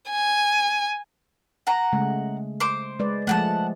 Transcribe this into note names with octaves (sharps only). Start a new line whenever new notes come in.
G#5
F#5 A#5
C#3 G#3 A3
C5 D6
G#3 B4 D5
F3 G#3 A3 F#5 G5 A5